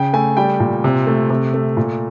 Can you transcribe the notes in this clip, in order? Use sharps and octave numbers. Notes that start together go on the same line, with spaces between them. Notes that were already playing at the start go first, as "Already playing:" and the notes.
Already playing: C#3 G5
A3 G#5
G3 G5
A#2
C3
A3
C3
A3
A#2